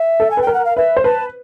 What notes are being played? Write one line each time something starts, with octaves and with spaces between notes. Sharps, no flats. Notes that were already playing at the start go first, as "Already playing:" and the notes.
Already playing: E5
A4
G#5
B4 G5
A#4
F#5
F5
B4 E5
C5
B4 A5